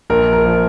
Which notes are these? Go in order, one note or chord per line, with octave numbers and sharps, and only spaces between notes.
A#1 A#4
A#4
F3